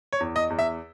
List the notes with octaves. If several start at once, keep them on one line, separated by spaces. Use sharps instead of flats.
C#5
E2
D#5
E2
E5